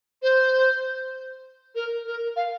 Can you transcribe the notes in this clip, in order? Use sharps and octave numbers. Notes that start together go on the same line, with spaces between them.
C5
A#4
A#4
F5